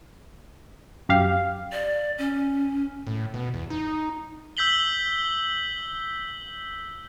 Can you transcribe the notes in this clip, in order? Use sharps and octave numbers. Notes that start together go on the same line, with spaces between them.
F#2 G4 F5
D5
C#4
A2
B2
E2
D#4
E6 G6 B6 F#7 G7